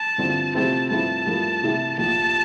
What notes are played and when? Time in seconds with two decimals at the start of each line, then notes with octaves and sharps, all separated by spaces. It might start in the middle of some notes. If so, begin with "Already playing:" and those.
Already playing: A5
0.18 G2 D3 F3 C4 E4
0.54 C3 F3 A3 C4 E4 A5
0.90 G2 F3 A3 C4 E4 A5
1.26 G2 F3 A3 E4 A#4
1.62 C3 E3 A3 E4 G4
1.98 A#1 A2 F3 A3 A5